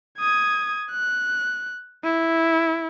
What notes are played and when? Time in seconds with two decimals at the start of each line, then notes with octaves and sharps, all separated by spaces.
0.19 D#6 G#6
0.91 F#6
2.04 E4